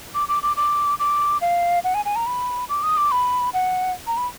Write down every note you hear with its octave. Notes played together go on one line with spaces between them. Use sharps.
D6
D6
D6
D6
D6
F5
F#5
G#5
G#5
A#5
B5
D6
D#6
D6
B5
F#5
A#5
B5